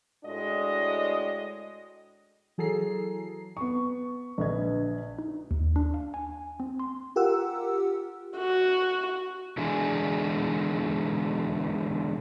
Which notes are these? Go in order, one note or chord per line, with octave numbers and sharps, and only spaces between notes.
A2 G#3 D4 F#4 D#5
E3 F#3 G#4 A4 A#5 C7
B3 C#6
A#1 D3 B4 D#5 G#6
D#4
D#2
D4
F5
G#5
C4
C6
F4 G4 A#4 F#5 E6
F#4
B2 D3 E3 G#3 D4 G#5